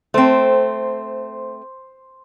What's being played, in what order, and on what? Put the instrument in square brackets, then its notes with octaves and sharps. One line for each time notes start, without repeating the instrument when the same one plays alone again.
[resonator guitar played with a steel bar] A3 C4 [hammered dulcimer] C5